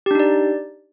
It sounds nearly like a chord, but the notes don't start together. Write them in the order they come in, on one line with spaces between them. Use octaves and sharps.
G4 D4 D#4 D5